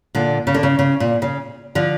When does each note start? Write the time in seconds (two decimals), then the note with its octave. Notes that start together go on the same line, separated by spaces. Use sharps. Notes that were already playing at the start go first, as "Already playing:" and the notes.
0.15 A#2 D3
0.47 C#3
0.54 D3
0.63 C#3
0.79 C#3
1.00 A#2
1.22 C#3
1.75 D3 F3